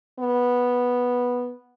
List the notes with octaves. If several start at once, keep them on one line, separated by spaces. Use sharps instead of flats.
B3